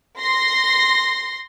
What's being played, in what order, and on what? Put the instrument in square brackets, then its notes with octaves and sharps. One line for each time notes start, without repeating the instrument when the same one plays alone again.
[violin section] C6 A#6 C7